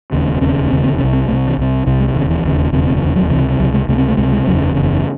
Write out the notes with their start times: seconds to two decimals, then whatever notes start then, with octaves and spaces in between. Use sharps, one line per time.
0.12 E1 D#2 C#3
0.41 E1 D#2 C#3 C4
0.70 E1 D#2 C#3 C4
0.84 C4
0.98 C3 C#4
1.04 C2
1.13 C4
1.28 C2 C3 A3
1.47 E3
1.57 C2 C3
1.86 C2 C3
2.00 G#3
2.15 E1 D#2 C#3 E3
2.30 E3
2.43 E1 D#2 C#3
2.72 E1 D#2 C#3 C4
2.87 C4
3.02 E1 D#2 C#3 E3
3.16 F#3
3.30 C3 E3
3.34 C#2
3.59 C#2 C3 F#3
3.73 G#3
3.88 C#2 C3 A3
3.98 C4
4.08 A3
4.17 C#2 C3 G#3
4.32 G#3
4.46 F#1 E2 C#3 F#3
4.75 F#1 E2 C#3